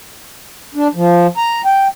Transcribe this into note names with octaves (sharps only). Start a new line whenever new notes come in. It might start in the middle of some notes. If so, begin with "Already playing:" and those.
D4
F3
A#5
G5